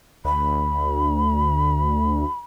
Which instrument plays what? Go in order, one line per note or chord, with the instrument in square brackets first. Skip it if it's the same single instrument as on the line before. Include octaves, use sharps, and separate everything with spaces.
[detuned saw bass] D2 [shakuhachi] B5